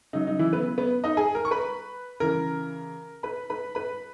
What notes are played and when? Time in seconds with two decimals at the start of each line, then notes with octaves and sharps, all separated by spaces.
0.13 C#3 F#3 D#4
0.27 D#4
0.39 E3 E4
0.53 B3 B4
0.78 B3 B4
1.04 D#4 D#5
1.17 G#4 G#5
1.35 A#4 A#5
1.45 C#6
1.51 B4 B5
2.20 C#3 E3 A#4 A#5
3.23 B4 B5
3.50 B4 B5
3.75 B4 B5